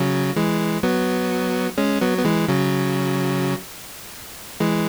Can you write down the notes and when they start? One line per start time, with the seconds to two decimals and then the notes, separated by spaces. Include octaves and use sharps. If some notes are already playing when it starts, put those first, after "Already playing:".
Already playing: C#3 F#3
0.36 E3 G#3
0.83 F#3 B3
1.78 G#3 C#4
2.01 F#3 B3
2.18 B3
2.25 E3 G#3
2.48 C#3 F#3
4.60 E3 G#3